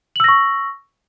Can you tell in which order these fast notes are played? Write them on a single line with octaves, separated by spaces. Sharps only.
F#7 E6 A#6 C#6